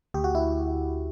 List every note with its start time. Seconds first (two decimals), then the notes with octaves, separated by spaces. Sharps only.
0.14 D2 G4
0.24 F#4
0.35 E4